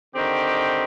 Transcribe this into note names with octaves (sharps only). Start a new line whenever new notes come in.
D3 D#3 C4 G4